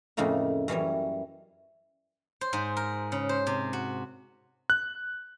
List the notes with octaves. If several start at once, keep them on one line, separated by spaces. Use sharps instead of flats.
F2 A2 C#3 A#3 D#4
F#2 E3 G3 C#5
C5
G#2
A#4
C#3
C5
C3
F#4
F#6